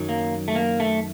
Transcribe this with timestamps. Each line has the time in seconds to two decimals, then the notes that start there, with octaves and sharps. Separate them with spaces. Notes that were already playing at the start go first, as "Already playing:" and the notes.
Already playing: F#2 D#3 F#3
0.09 A#3
0.48 A3
0.55 A#3
0.80 A3